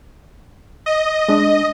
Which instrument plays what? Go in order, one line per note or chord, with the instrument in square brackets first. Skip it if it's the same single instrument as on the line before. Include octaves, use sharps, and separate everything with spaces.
[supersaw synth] D#5
[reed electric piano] G#3 D4